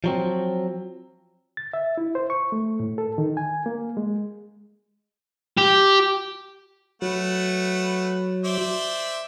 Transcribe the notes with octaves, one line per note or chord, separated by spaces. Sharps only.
F3 F#3 C4
A6
E5
E4
C5
C#6
A3
A2
A4
D#3
G#5
A#3
G#3
G4
F#3 A3 B4 F#5
C5 D5 E5